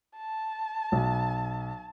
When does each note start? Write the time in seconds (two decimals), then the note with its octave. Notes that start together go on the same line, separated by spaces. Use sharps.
0.17 A5
0.92 B1